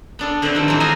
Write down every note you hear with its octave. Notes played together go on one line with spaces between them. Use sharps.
B3 D4 A4
D3 A3 C4 B4 C5 D5
G2 D#3 F3
D#3 E3 F#3 C4
F4 F#4 G#4 C5 D#5 G#5